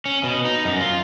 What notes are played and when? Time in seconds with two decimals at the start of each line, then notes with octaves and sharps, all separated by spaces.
0.06 C#4
0.23 B2
0.45 D#4
0.65 F#2
0.81 F4